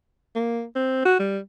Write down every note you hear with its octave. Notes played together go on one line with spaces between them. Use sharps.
A#3
C4
F#4
G3